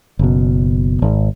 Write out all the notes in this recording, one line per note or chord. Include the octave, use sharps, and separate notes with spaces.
F#1 B2
G#1